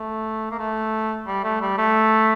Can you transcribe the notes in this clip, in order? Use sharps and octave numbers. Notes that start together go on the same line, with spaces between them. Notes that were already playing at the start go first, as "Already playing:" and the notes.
Already playing: A3
A#3
A3
G3
A3
G3
A3